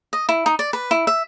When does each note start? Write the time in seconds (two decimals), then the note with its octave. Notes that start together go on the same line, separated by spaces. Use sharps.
0.13 D#5
0.29 E4
0.46 D#4
0.59 D5
0.73 B4
0.91 E4
1.07 E5